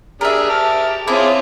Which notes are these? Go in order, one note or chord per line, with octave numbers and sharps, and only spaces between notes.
D4 G4 G#4 A#4 E5
A5 F6
C4 E4 F4 G#4 C#5 D6